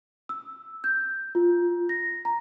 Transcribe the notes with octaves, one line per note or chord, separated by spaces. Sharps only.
E6
G6
F4
A#6
A#5